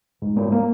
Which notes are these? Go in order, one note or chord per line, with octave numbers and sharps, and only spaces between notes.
G#2
A#3
A#3